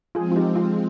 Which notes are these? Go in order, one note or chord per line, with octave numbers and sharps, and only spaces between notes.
F3 G#3 C4 F4 G#4
F4
D#4 G4
F4